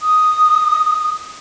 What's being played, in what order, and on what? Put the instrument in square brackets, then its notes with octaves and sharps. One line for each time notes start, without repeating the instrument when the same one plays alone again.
[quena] D#6